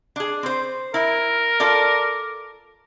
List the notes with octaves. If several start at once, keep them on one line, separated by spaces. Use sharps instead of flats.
D4 G#4
C4 C5
E4 A#4
F4 A4 D5